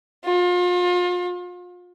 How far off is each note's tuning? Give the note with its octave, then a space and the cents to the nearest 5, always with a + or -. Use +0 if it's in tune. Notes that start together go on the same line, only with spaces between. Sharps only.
F4 +35